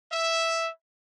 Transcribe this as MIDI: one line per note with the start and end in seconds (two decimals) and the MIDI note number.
0.12 0.70 76